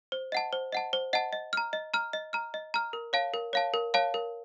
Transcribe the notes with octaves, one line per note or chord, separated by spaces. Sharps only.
C5
D#5 F#5 A5
C5
D#5 F#5 A5
C5
D#5 F#5 A5
D#5
A#5 F6
D#5
A#5 F6
D#5
A#5 F6
D#5
A#5 F6
A#4
C#5 F5 A5
A#4
C#5 F5 A5
A#4
C#5 F5 A5
A#4